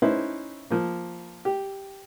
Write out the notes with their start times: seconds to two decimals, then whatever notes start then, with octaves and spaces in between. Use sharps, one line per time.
0.02 C#4 D#4 E4 B4 C5
0.70 F3 A#3
1.45 G4